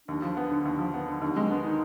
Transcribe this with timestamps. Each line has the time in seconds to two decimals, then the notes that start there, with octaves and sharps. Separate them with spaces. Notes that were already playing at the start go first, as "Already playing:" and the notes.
0.08 D#2 D4
0.22 F3
0.37 B3
0.51 D3
0.65 D#2
0.79 F3
0.94 B3
1.08 D3
1.21 D#2 D4
1.36 G#3 C4
1.50 B3 D4
1.64 D#3 D#4